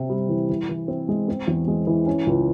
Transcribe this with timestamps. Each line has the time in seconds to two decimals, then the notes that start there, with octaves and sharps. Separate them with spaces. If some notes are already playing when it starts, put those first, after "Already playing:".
Already playing: C3 C4
0.09 G3
0.29 E3
0.49 E3
0.69 E3
0.88 C4
1.09 G#3
1.28 C4
1.47 E2
1.68 G#3
1.87 E3
2.06 C#4
2.27 C#2